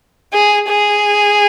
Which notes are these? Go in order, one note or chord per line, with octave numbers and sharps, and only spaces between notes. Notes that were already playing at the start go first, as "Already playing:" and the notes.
G#4
G#4